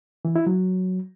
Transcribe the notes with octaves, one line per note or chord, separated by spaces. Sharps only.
E3
E4
F#3